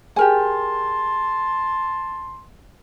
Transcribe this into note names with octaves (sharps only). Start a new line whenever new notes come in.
G4 G#4 A#4 G#5 A5 C6